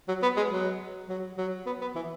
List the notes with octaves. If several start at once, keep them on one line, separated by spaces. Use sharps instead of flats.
F#3
B3
G#3
F#3
F#3
F#3
B3
B3
E3